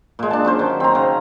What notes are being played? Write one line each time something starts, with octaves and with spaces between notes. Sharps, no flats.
A#2 G#3
D4 A5
F#3 C#4 C5
D#3
C4 A#5
C#3